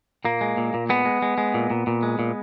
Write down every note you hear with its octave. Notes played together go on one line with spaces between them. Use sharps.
A#2 A#3
G#3
A#2
A#2
G#3 B3
G#3
G#3
G#3
A#2
A#2
A#2
G#3
A#2